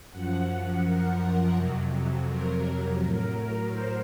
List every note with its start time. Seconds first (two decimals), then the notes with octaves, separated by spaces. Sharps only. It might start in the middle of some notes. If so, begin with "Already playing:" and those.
0.11 F#2 F3 F#5
0.83 A#4
1.55 F2 C3 F#3
2.28 A#4
3.00 A2 F#3
3.71 C5